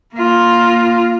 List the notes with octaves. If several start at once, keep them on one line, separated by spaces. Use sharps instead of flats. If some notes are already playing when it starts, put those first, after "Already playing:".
A#3 F4